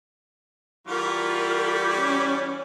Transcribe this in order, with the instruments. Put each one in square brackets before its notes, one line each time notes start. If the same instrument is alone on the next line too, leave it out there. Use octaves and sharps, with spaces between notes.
[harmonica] E3 G3 F#4 [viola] F4 A#4
[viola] C#4